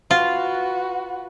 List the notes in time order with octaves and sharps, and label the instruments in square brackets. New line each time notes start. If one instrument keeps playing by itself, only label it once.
[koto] F4 [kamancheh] F#4 B4